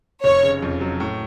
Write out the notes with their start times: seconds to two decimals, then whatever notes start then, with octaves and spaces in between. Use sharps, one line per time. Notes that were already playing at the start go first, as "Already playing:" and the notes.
0.24 F1 C#5
0.43 C#3
0.62 F2
0.81 F#3
1.00 A2